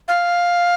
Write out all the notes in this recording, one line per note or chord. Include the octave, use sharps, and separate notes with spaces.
F5